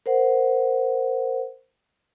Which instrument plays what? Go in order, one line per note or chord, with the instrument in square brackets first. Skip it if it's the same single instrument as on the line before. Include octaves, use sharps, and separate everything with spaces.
[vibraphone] A#4 C5 F#5